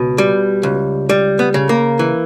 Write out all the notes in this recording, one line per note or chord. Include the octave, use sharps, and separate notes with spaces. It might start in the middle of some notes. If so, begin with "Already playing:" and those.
Already playing: C#2 B2
G3
C#2
G3
B3
C#3
A#3
E3